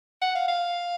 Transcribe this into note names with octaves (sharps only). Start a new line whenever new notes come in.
F#5
F5
F5